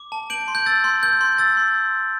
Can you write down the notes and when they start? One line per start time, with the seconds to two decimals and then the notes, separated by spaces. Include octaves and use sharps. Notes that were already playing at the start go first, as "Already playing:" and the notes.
Already playing: D6
0.12 A5
0.30 G6 D7 F#7
0.48 C6
0.55 G6
0.66 E6 A6
0.84 C6
1.03 G6
1.21 C6
1.38 E6 A6
1.57 C6